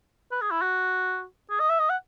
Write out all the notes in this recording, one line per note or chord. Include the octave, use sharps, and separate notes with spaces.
B4
G#4
E4
F#4
G#4
D#5
E5
D#5
F#5